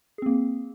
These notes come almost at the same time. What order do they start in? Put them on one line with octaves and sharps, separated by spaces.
G#4 C4 A#3